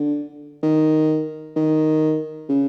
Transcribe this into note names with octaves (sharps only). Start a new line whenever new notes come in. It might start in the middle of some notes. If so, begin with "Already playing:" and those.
Already playing: D3
D#3
D#3
C#3